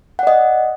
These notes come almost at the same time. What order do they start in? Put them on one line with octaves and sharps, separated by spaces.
F#5 D5 D#5